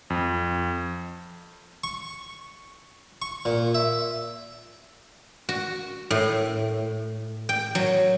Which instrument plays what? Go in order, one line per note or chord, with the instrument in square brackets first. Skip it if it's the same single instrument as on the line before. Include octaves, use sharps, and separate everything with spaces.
[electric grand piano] F2
[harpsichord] C#6
C#6
A#2
E5
[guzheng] F#4
A2
G5
F#3